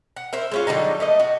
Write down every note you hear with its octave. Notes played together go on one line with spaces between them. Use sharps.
F#5
A#4 C5 E5
G#3 C#4 F4
D3 F#3 G3 D#4
A3 A#3 D#5
F#4